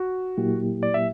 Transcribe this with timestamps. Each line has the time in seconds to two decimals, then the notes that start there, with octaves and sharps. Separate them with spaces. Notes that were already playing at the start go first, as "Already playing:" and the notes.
Already playing: F#4
0.37 A#2 F#3 A#3 E4 G4
0.83 D5
0.94 E5